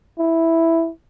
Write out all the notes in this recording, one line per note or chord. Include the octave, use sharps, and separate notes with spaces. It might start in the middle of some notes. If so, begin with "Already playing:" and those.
E4